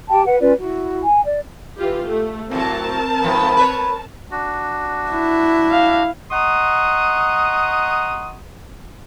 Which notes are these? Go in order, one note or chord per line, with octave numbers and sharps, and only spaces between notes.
G4 G5 A5
B4 F#5
C#4 F4 B4 D5
E4 F#4
G#5
D5
E3 F4 G4
A3
A2 F#3 C4 A#4 A5
G#2 F3 B3
B4 C#5
D4 F#4
E4
F5
D#5 F#5 A#5 C6 C#6 D#6